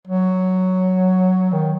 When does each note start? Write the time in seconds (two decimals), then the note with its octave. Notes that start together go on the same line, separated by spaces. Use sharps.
0.08 F#3
1.52 D#3